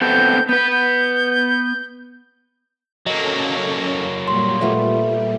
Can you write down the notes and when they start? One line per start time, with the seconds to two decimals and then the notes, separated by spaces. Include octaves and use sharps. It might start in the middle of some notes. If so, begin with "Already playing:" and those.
0.01 B3 C4 A4 G6
0.49 B3 B4 G6
0.72 G6
3.07 F#3 A#3 C#4 A4 D#5
4.28 A#2 G3 C6
4.61 A3 B3 F4